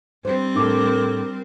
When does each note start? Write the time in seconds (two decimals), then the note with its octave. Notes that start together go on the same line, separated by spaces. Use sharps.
0.25 G3 C4 D4 C5
0.55 A2 D4 A4 A#4 D6